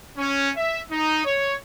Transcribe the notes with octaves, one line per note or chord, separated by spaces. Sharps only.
C#4
E5
D#4
C#5